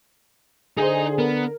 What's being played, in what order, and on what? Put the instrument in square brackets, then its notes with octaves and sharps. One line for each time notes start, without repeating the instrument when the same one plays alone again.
[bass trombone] D3 [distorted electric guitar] D#4 D#5 [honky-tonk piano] G#4 C5
[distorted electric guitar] B3 [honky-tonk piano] A#4